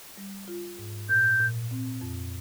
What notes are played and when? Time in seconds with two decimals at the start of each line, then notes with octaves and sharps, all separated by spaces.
0.17 G3
0.48 F4
0.79 G#2
1.09 A#2 G6
1.40 A#2
1.71 C4
2.01 F2